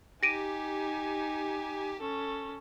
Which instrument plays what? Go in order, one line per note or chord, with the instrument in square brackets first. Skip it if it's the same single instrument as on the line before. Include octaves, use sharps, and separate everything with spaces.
[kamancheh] D#4 G#5 [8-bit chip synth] G4 [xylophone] A#6 D7 D#7
[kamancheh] C#4 A4